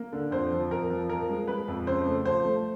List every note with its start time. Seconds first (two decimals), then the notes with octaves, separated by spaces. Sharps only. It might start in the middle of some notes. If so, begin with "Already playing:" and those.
Already playing: A#3
0.13 D3
0.31 F2 C5
0.52 F3
0.71 F2 A#4
0.90 F3
1.09 F3 A#4
1.29 G#3
1.47 G#3 B4
1.68 F2
1.86 C#3 C5
2.06 A3
2.25 F3 C5
2.45 A3